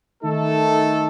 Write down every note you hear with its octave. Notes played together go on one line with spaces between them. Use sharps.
D#3 A3 D#4 A4